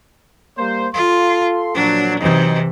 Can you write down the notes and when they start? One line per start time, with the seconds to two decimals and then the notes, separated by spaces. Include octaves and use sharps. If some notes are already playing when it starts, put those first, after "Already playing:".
0.58 G3 A#3 C5
0.94 F4 A4 F5 C6
1.75 A#2 F3 F#3 D4
2.20 C3 E3 F#3 C4 D#4